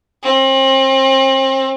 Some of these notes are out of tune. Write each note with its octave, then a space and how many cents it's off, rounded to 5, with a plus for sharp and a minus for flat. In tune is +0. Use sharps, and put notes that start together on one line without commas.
C4 +35